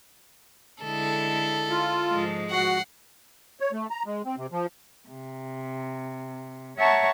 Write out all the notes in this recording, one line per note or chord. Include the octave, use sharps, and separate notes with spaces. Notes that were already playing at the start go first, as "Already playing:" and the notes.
D3 G#3 E4 A4
F4
G#2 F3 G#3
F#4 F#5 C7
C#5
A3
A#5
G#3
C4
C3
F3
C3
C#5 E5 F#5 A5 A#5 C#6